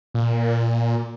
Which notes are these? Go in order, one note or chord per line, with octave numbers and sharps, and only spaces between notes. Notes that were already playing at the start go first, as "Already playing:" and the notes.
A#2